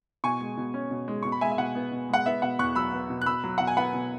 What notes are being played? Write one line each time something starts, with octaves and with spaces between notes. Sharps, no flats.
B2 G#5 C#6
G#3
B2
C#4
B2
G#3
B2 C#6
B5
G#3 E5 G#5
E5
B2 F#5
B3
B2
G#3 F#5
B3 E5
B2 F#5
E2 C#6 F#6
F#3 B5 E6
B3
B2
F#6
B2 B5 E6
F#3
B2 F#5
G#5
B3 F#5 B5
B2